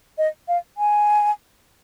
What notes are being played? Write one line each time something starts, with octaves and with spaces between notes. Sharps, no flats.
D#5
F5
G#5